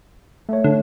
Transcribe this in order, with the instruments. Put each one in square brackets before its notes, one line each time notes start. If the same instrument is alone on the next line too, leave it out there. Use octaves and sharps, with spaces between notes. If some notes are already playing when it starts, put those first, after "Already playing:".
[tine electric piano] A3 C#5
[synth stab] D3